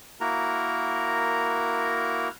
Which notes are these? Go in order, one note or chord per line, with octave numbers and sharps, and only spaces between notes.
A#3 E4 F#4 A#4 A#5